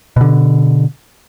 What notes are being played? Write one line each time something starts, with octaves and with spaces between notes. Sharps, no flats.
B2 D3